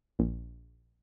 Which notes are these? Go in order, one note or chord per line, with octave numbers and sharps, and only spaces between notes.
A#1